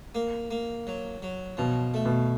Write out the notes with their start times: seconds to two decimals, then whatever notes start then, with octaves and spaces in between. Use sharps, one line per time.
0.15 A#3
0.51 A#3
0.87 F#3
1.22 F#3
1.57 B2 F3
1.94 A3
2.05 B2